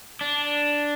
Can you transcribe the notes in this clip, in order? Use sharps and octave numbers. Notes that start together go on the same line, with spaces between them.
D4